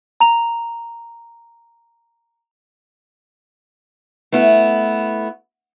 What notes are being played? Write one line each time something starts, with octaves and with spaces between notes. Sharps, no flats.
A#5 F7
A3 B3 E4